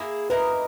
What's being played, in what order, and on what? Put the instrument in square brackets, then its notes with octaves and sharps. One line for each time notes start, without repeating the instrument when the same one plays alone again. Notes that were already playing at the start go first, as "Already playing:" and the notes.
Already playing: [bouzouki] A#3 E4 G#4
[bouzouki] A#3 E4 A#4 D#5 [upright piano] B4